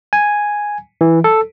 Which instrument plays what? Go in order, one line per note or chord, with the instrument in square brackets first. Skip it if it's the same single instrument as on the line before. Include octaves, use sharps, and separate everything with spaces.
[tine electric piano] G#5
E3
A4